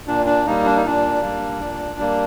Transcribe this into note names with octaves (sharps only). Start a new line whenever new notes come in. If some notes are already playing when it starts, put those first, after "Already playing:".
A#2 D4
D4
G3 A#3 D#4
D4
D#4
A#2 D4
G3 A#3
A#2
G3 A#3